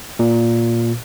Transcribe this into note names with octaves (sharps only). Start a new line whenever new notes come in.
A#2